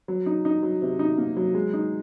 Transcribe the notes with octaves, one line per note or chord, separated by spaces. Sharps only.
F#3
D#4
D#4
F#3
C3
D#4
A#3
F#3
G#3
D#4